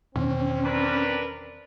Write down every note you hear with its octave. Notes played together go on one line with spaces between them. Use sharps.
E2 B2 D#3 C4 C#4
D4 A#4 B4